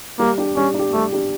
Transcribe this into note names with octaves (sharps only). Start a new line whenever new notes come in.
G3 A#3
D4 G4
G3 C#4
D4 G4
G3 A3
D4 G4